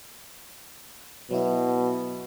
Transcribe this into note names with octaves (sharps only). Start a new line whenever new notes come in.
B2 F#3 E4